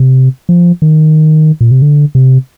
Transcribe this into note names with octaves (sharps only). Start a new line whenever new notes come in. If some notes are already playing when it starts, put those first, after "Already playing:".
Already playing: C3
F3
D#3
A#2
C3
D3
C3